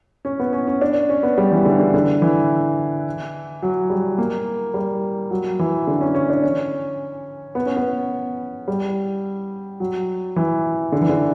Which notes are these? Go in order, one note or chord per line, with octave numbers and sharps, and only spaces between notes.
C#4
B3
C#4
C#4
D4
C#4
B3
G3
E3
D3
D3
D3
E3
F#3
G3
A#3
G3
F#3
E3
D3
C#4
C#4
D4
C#4
B3
C#4
B3
G3
F#3
E3
D3
E3
D3